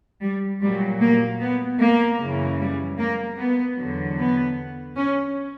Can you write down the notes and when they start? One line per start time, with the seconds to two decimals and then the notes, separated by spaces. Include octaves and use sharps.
0.22 G3
0.61 A#2 F#3 G3
1.01 A#3
1.40 B3
1.81 A#3
2.20 F#2 C#3 E3
2.60 G3
2.99 A#3
3.38 B3
3.78 E2 D3 F#3
4.18 B3
4.97 C#4